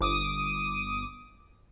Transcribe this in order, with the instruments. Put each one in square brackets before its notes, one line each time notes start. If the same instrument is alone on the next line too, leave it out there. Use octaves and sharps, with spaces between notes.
[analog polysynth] G1 D6 D#6 D#7